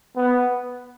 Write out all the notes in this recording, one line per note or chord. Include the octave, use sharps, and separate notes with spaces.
B3